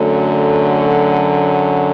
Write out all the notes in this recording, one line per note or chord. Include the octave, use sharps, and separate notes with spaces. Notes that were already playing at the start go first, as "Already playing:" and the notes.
Already playing: F#2 D3 F#3 A3